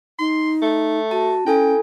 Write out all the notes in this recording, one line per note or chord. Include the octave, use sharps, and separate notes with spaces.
D#4 C6
A3
F#4 A5
C#4 E4 A4 G5 G#5